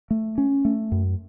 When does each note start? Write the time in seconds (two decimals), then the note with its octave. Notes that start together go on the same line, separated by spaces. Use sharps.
0.11 A3
0.38 C#4
0.65 A3
0.92 F#2